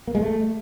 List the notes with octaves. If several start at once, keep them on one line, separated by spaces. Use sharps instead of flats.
A#3
G#3
A3